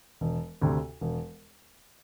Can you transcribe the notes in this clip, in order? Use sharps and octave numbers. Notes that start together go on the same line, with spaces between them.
E1
D2 C3
E1